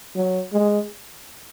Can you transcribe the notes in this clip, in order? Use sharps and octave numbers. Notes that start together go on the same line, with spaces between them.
F#3
G#3